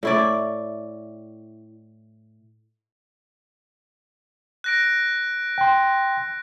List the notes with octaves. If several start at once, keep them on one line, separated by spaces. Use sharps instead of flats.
A2 E4 D5
F#6 A#6 D7
G5 C6